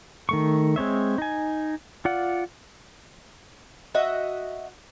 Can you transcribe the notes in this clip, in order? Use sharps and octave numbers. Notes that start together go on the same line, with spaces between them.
D#3 A3 C#6
G#3 C4 C#5 E5
D#4 G#5
F4 D5 F#5
F#4 D#5 E5